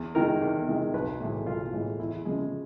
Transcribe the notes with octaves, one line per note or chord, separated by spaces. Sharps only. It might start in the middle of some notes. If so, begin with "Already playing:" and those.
Already playing: E2
C3 D#3 G#3 A#4
E2
C3 D#3 G#3
B1 B4
A2 E3 G#3
B1 F4
A2 E3 G#3
E2 E4
C#3 F3 G#3